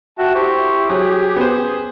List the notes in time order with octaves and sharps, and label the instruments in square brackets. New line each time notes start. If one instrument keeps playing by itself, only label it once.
[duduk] F#4 [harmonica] E5 G5 A5
[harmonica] E4 C5 C#6 [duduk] G4
[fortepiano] F#3 [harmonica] G#4
[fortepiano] B3 C5